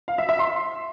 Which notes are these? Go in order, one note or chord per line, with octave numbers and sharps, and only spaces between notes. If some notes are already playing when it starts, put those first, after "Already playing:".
F5
E5
E5
C6